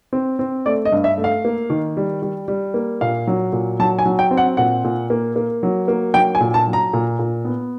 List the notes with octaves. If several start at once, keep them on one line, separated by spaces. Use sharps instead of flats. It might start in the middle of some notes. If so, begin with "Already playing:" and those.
C4
C4
A3 D5
D#5
G2
E5
A3
F5
A#3
D#3
G3
G3
G3
A#3
A#2 F5
F#3
A#2
F#3 A5
G#5
F#3
G5
C4
F#5
A#2 F#5
A#2
A#3
A#3
F#3
A#3
F#3 G5
G#5
A#2
A5
F#3
A#5
A#2
A#2
B3